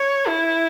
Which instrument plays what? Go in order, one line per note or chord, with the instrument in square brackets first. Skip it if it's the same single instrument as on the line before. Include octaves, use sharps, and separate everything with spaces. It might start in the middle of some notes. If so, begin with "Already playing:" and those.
Already playing: [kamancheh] C#5
E4